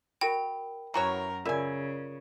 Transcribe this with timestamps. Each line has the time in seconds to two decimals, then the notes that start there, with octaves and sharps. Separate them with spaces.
0.21 F#4 A#4 G5 B5
0.94 F#2 E3 F#4 A#4 C#5 G#5 A#5
1.45 C#3 F4 A#4 D5 E5 G#5